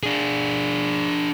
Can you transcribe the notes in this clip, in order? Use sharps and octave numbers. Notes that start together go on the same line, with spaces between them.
D4 G#4